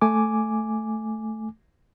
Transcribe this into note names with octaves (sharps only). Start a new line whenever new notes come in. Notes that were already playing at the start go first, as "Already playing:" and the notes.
A3 G#5 D6